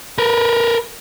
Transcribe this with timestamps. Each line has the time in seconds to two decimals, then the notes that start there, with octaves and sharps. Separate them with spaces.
0.18 A#4 B4